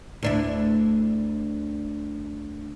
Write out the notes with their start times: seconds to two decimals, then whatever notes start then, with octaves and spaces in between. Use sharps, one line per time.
0.23 D2 D4 E4